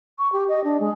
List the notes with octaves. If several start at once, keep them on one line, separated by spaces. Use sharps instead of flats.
C#6
G4
D#5
D4
G#3